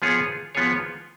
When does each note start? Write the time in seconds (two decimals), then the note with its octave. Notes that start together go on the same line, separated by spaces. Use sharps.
0.02 F3 B3 F4 G#4 C#5
0.55 F3 B3 F4 G#4 C#5